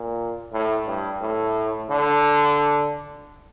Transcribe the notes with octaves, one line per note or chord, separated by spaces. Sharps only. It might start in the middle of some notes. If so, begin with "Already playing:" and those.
Already playing: A#2
A2
G2
A2
D3